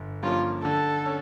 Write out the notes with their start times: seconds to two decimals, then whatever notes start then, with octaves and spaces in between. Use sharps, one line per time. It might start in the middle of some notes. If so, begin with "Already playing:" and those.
Already playing: G1
0.23 G2 F3 A#3 C#4 F4
0.64 D3 A4
1.06 C#4